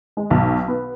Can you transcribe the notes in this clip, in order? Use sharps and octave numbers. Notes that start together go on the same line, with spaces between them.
G#3
B1
B3